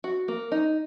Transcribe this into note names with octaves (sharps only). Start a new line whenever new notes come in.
F#4
A#3
D#4